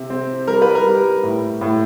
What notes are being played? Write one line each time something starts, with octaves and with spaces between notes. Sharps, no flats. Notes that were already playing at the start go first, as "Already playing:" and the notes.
Already playing: C3
C4
G3 A#4
B4
A#4
G3
A2
A2